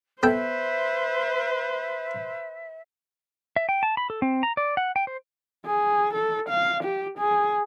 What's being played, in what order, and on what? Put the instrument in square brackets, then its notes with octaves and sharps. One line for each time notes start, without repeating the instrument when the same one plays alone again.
[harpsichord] B3 A4 G5 [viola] B4 C5 [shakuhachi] E5
[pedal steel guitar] E5
G5
A5
B5
A4
C4
A#5
D5
F#5
G5
C5
[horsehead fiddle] G#4
A4
F5
G4
G#4